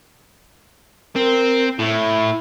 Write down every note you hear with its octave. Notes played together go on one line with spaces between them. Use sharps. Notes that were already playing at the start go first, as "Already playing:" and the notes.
C4 A#4
A2 E4